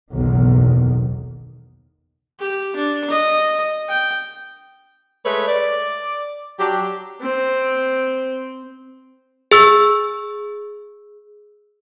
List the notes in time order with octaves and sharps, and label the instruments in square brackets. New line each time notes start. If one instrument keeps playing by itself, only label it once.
[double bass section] F#1 B1 E2 D#3
[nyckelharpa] G4
D4
D#5
G5
[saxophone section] G#3 A3 B4 C#5
D5
F#3 D4 G4
[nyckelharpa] C4
[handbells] G#4 E6